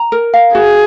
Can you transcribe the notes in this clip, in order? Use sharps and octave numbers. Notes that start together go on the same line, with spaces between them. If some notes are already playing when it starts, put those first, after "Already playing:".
Already playing: A#5
A#4
F5
F#4 G#4